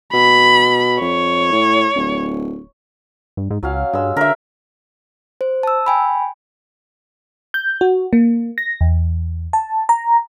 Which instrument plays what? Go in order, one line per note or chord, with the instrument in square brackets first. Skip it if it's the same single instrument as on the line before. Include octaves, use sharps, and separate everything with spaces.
[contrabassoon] B2 [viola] B5
[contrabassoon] F2 [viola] C#5
[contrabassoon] A2
D1
[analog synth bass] G2
G#2
[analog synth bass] C#2 [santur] F#3 C#4 F5
[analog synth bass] G2 [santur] G#3 E6
[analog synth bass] D3 [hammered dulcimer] A#4 E5
[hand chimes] C5
A5 E6
G5 G#5 B5
[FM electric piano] G6
F#4
A#3
A#6
E2
A5
A#5